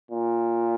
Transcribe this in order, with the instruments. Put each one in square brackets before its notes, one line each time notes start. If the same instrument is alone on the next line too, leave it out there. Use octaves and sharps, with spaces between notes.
[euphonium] A#2